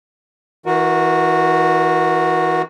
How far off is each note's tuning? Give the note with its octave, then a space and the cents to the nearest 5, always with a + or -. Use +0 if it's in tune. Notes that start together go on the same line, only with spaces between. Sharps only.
E3 -30 F#4 -15 A#4 +0